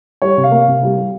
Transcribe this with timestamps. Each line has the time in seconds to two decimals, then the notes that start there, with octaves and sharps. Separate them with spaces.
0.22 G3 C#5
0.37 C3
0.44 F5
0.51 A#3
0.68 C3
0.83 G3
0.98 G3